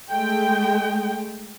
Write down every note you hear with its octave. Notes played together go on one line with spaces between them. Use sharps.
G#3 A3 G5